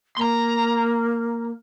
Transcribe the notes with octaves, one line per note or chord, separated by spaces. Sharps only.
A#3 A#5 C6